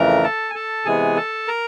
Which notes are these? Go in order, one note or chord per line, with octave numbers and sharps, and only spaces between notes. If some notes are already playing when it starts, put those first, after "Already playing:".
Already playing: F2 C#3 E3 A3 A#4 A#5
A4 A5
G#5
A4 A5
C3 E3 G#3 B3 G#4 G#5
A4 A5
A#4 A#5